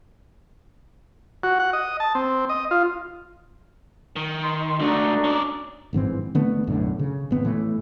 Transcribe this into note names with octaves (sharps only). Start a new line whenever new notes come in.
F#4
F#5
D#5
A5
C4
D#5
F4
D#3
C6
C#2 A3 D4 D#4 F#4 A#5
C#4 D5
G1 G#2 E3 C4
D3 A3 B3 C4
B1 F#2 A2 D3
C#3
G#1 B3 C4
A2 E3 A3